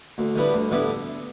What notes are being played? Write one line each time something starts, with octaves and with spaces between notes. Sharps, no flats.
D2
D3 G3 B3 E4
D2
D3 G3 B3 E4